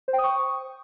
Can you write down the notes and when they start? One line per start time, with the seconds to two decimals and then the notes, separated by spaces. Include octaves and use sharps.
0.08 C5
0.13 G5
0.18 D#6
0.24 C#6